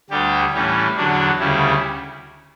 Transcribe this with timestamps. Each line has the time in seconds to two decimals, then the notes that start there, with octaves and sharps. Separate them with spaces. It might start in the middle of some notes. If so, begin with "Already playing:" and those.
0.10 D2 D3 G3 G4
0.54 A2 E3 G3 C#4
0.96 E2 D3 F#3 D4
1.39 D2 C#3 G3 E4